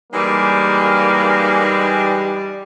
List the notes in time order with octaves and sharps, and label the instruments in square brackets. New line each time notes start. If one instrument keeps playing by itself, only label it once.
[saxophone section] E3 G#3 D#4 [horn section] G3 [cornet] A#3